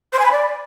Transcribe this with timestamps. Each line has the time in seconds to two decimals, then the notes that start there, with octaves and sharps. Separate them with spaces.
0.13 C5
0.19 G#5
0.25 B5
0.31 D5